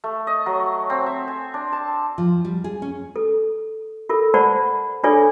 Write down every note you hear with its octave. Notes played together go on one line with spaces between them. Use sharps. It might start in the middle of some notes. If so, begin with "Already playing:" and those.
A3
D#5
F#3
C4
E5
G#5
D4
A5
F3
G3
G#4
C#4
A4
F4 A4 A#4
C5 D5 F#5 A5 B5
D4 F4 G#4 A4 C#5 D5